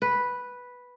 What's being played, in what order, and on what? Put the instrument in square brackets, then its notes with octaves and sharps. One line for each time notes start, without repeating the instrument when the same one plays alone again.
[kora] B4